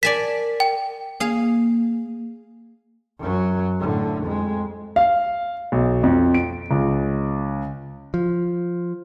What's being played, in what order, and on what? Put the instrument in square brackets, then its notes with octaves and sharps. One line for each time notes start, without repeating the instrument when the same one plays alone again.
[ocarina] A#4 [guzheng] D5 G#5 A5 [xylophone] B6
[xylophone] G5
[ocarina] A#3 [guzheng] G#4 F5
[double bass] F#2 F#3
A2 D3
F2 G#3
[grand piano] F5
B1
F2
D7
C#2
[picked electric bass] F3